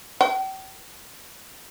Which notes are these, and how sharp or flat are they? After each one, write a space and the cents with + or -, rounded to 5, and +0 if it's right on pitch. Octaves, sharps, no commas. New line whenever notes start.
G5 -40